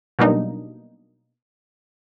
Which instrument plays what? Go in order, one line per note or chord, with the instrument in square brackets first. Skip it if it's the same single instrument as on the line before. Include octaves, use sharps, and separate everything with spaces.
[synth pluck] B2 F#3 G3 A#3 D4 D#4